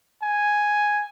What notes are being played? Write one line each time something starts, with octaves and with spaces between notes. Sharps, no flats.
G#5